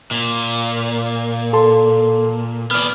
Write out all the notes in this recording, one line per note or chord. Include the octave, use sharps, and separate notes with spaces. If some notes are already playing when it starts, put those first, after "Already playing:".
A#2
A4 A5 C6
B3 D5 F6